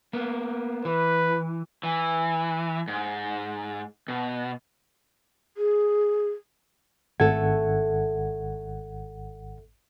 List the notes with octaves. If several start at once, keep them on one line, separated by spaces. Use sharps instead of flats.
A#3 B3
E3 B4
E3
G#2
B2
G#4
G#1 A3 A4 F#5 G#6